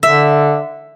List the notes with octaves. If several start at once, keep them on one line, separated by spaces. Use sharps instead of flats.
D3 E5